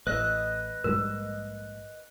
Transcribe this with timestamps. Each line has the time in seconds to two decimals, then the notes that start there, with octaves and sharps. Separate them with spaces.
0.07 A1 B4 D#5 E6 F#6
0.84 A#1 G#2 G3 A#4